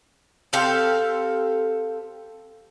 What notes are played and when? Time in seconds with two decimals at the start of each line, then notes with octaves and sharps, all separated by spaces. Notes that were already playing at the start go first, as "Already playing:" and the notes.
0.53 C4 G4 A4 F5